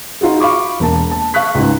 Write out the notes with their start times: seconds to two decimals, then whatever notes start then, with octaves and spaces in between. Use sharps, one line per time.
0.21 D#4 F4 F#4 G#4
0.40 F5 B5 C#6 D6
0.80 E1 A#3 A5
1.11 A5
1.34 F5 C#6 F#6 B6
1.55 C#2 G#2